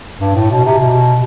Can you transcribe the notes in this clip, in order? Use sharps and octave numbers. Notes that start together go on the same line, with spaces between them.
G2
A2
B2
C3
B2